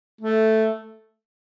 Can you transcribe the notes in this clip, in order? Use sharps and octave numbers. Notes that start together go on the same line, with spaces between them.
A3